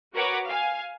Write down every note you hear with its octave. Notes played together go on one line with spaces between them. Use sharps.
F#4 A#4 B4 C#5 F#5 D6
F5 G#5